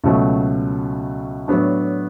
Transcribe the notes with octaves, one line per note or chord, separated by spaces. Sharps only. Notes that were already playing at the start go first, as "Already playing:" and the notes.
C#2 B2 F#3 A3
A2 F#3 B3 D4